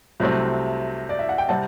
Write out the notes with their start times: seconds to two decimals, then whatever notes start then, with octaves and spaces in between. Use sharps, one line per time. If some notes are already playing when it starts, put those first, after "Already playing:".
0.20 C2 C3 F#3 A3 C4
1.09 D5
1.19 E5
1.29 F#5
1.38 G5
1.49 C3 G3 C4 F#5 A5